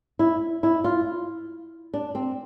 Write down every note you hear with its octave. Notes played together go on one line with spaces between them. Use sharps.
E4
E4
F4
D4
C4